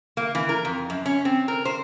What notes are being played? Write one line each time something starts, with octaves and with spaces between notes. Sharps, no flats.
A#3
E3
A#4
F2
F#2
C#4
C4
A#4
C5